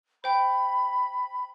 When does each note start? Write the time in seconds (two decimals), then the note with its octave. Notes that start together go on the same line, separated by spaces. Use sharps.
0.24 C5 G5 B5